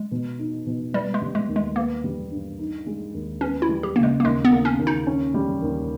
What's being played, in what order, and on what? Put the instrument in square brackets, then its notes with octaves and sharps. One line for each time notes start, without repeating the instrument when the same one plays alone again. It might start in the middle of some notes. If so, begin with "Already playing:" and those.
Already playing: [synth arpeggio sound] G#3
[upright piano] B2
D#4
B2
[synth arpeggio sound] G3 [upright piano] B3
[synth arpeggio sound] G#3
[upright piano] G3
[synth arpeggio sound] G#3
[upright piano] D#2
[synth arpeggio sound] G#3
[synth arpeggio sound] A#3 [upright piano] B3
[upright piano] G3
G2
D#4
G#3
D#2
[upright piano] B3 [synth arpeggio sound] C#4
[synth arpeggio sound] E4
[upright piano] G3
[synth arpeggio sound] G4
[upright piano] C#3 [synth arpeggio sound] A#3
[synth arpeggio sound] G#3
A#3
[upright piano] D#2 [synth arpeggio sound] G#3
[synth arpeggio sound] B3
[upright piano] A#3
[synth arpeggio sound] C#4
[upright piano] D#2
[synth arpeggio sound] D#4
[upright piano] C#4
G3
D#2